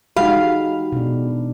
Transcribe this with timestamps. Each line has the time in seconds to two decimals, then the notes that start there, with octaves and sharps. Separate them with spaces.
0.16 E3 G#3 D#4 F#4 G4 F5 B5
0.92 B2 D4